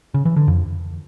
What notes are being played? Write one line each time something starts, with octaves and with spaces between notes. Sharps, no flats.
C#3
E3
D3
F2